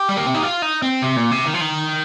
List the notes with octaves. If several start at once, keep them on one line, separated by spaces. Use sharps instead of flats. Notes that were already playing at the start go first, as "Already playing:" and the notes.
Already playing: G4
G3
A#3
C4
D#4
F4
D#4
C4
C3
A#2
C3
D#3
F3
D#3